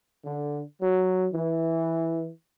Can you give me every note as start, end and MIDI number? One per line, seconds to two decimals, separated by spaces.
0.25 0.61 50
0.82 1.27 54
1.34 2.30 52